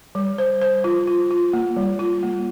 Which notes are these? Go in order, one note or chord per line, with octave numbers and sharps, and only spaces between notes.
G3
C5
C5
F4
F4
F4
A#3
G3
F4
A#3